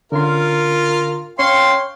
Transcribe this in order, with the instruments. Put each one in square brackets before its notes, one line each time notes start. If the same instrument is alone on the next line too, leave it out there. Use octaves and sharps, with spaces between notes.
[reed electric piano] D3 C#4 C6 [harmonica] F4 [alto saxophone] A#4
[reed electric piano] C#4 [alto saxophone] C#5 [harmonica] F5 G5 [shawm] C6